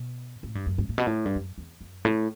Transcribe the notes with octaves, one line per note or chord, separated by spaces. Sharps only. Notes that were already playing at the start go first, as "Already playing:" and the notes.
Already playing: B2
A2
G2
F#2
G2
A2
B2
A2
G2
F#2
E2
F#2
A2